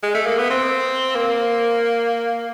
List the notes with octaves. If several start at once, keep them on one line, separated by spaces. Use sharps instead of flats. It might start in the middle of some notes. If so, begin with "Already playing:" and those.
G#3
A3
A#3
B3
C4
A#3